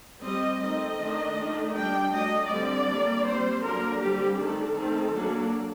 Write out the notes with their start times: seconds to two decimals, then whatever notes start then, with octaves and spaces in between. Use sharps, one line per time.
0.24 G3 C4 D#5
0.61 D#3 A3 C4 D#5
0.99 D#3 A3 D4
1.37 D#3 A3 D4
1.74 G3 D4 G5
2.12 F#3 A3 D4 D#5
2.50 D3 G3 C4 D5
2.88 G3 A#3 D4
3.25 G3 C4 C5
3.62 D3 F#3 A#3 D4 A#4
4.01 D3 G3 C4 G4
4.38 D#3 A3 D4 A4
4.76 D#3 A3 C4
5.14 F#3 A#3 D4